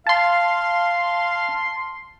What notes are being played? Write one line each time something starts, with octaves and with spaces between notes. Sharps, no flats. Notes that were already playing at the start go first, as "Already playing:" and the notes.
F5 A5 C6